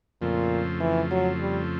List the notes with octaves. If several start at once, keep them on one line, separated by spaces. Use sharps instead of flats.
F2 A#2 C#3 F3 A3 C4
E3
F#3
G3